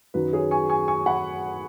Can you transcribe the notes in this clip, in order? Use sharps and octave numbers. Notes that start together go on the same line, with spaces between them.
F#2 D#3 F#3 F#4 B4
G#4 C#5
G#5 C#6
G#5 C#6
G#5 C#6
F#5 B5